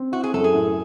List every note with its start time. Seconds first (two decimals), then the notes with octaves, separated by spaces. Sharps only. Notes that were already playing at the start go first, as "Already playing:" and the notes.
Already playing: C4
0.12 E4 F#4
0.23 G#4
0.33 F#2 A4
0.44 G#4
0.54 A2